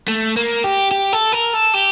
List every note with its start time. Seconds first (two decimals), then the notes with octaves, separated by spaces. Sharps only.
0.08 A3
0.37 A#3
0.64 G4
0.91 G4
1.13 A4
1.33 A#4
1.54 A4
1.75 G4